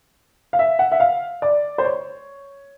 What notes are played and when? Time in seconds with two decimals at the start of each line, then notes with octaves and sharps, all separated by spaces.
0.53 F5
0.59 E5
0.79 F#5
0.92 E5
1.00 F5
1.42 D5
1.78 C5
1.84 C#5